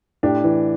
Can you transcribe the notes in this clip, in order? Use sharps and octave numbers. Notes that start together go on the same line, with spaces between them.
A2 D4 G4
E3